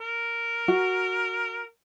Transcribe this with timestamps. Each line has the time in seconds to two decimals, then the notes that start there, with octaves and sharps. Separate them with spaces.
0.01 A#4
0.68 F#4